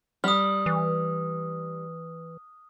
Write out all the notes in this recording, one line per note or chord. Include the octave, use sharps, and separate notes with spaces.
G3 D#6 F6
E3